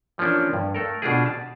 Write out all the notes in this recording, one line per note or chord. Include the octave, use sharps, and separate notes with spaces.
E3 F3 A#3 C#4 D4
G2
A3 A4 A#4
B2 D4 F4 G4 G#4
A5